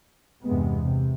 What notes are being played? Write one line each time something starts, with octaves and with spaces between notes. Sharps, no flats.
E2 G2 C3 G#3 B3
C3